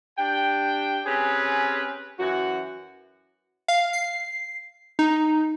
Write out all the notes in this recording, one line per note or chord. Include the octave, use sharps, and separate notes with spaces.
D4 G4 G5
C4 C#4 G4 G#4 B4
F#2 E3 F#4
F5
C7
D#4